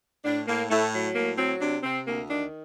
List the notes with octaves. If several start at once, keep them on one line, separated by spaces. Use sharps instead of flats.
A2 D4
A2 A#3
A2 A3
F#3
A2 A#3
F#3 C4
C3 D4
C3 C4
D2 A#3
D#3 D4